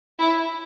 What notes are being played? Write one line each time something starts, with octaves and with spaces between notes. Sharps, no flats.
E4